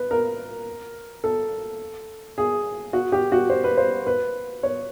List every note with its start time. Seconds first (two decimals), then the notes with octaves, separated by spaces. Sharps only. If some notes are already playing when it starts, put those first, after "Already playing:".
Already playing: B4
0.11 A#4
1.24 A4
2.38 G#4
2.93 F#4
3.12 G4
3.32 F#4
3.50 C5
3.64 B4
3.77 C5
4.07 B4
4.63 C#5